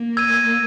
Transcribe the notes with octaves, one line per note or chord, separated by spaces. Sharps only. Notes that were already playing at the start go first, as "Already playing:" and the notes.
Already playing: A#3
E6 G#6 D#7